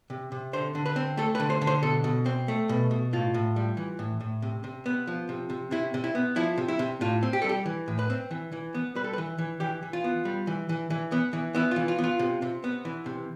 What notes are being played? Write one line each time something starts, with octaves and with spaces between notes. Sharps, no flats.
C3
C3
D3 C5
D3
B4
C4
A3 A4
B4
D3
C5
D3
C5
B2 A4
B2
C4
A3
B2
B2
A2 F4
A2
G3
E3
A2
A2
C3
C3
B3
F3
C3
C3
C3 E4
C3
E4
B3
F3 E4
C3
E4
C3
A2 F4
C4
G4
G3 A4
G4
E3
A2
B4
C4
E3
E3
B3
G3 B4
A4
B4
E3
E3
E3 G4
E3
F4
B3
G3
E3
E3
E3
B3
E3
B3 E4
F4
E3
F4
B3
F4
C3
C3
B3
E3
C3